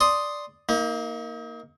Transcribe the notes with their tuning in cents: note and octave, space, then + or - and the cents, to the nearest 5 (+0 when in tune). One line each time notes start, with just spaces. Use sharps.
D5 +0 C6 +0 D#6 +0
A#3 +0 D#4 +40